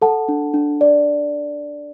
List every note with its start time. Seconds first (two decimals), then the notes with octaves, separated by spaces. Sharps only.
0.02 A4 F#5 A5
0.28 D4
0.54 D4
0.81 D5